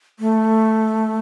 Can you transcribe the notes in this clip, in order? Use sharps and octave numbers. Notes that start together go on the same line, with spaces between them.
A3